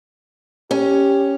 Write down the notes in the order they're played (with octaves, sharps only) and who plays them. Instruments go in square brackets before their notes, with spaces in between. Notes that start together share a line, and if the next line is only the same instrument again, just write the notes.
[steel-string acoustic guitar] C#4 [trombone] G4